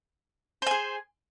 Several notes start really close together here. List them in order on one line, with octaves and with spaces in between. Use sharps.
C5 G#5 G#4